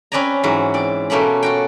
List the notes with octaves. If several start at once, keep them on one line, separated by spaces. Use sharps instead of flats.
C4 C#4 B4 D5 G#5 A#5
G#2 E3 F#3
C4 D5
B2 A3 A#3 C#4 B5
F4 F#4 G5